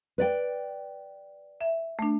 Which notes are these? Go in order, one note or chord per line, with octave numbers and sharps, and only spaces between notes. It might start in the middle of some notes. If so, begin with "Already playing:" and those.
B4 D5 G5
E5
A3 D4